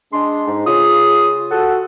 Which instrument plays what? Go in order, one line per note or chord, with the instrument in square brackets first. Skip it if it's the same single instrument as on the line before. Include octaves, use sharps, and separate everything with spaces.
[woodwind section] G#3 C6 [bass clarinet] D4
[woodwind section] G#2
[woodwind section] C#3 D#6 [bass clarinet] F4
[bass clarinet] F#4 [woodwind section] A4 F#5